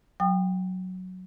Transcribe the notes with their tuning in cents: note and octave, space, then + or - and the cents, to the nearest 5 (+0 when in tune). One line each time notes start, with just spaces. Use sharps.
F#3 +0 G5 +20 D#6 -35